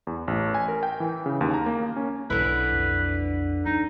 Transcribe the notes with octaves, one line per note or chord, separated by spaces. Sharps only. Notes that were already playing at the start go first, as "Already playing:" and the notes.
E2
A1
G#5
A#4
G5
E3
C#3
D#2
A#5
A#3
C#4
B1 D3 G#3 D4 E4 B4
F2
E3 D#4